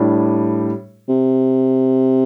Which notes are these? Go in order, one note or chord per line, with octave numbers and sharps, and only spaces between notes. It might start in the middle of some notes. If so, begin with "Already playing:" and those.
Already playing: A2 G3 D4 G4
C3